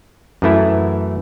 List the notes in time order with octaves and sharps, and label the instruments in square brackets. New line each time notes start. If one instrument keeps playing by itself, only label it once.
[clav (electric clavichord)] F#2 E3 A3 E4